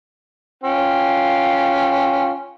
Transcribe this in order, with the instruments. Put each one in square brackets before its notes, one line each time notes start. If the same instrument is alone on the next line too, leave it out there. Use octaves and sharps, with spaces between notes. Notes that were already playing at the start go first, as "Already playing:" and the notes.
[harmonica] C#4 F4 G5